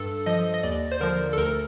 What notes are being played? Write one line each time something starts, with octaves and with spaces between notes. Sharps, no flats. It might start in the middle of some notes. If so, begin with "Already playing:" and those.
Already playing: G2 A4
F3 D#5
D#5
D#2 D5
C5
D3 F3 A#4
A4
D2 A#4